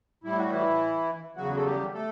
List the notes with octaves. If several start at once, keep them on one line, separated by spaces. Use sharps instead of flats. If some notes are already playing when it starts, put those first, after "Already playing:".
A2 G3 E4
F#4
E3 E4
E2 C#3 F#3 F#4
A4
G3 G4
A3 A4